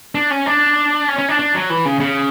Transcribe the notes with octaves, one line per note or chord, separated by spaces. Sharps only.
D4
C#4
D4
C#4
C#4
D4
D4
F#3
E3
C#3
C#3